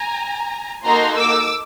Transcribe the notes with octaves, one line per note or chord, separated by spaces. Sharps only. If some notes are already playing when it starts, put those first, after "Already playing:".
Already playing: G#5 A#5
A#3 D#4 F#4 A4 A#5 C6
D6 E6